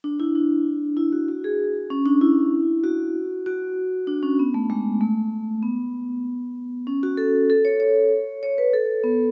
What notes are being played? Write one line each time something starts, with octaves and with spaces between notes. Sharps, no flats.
D4
E4
D4
E4
F#4
F#4
G#4
C#4
D4
E4
F#4
F#4
D4
C#4
B3
A3
G#3
A3
B3
C#4
F#4
A4
A4
C#5
C#5
C#5
B4
A4
B3